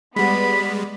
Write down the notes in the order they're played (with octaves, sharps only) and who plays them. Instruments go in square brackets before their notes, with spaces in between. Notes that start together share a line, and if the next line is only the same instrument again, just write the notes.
[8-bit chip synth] G3 G#3 [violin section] B3 D5 [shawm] B5